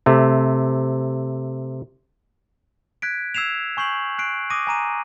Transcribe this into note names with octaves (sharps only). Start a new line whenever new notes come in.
C3 A3
F#6 G#6 B6 D7
E6 G#6 C7 E7 F7
G#5 C#6 G6 C7 F#7
F#6 C7 D7
D6 D#6 A#6 D#7
G#5 A#5 D#7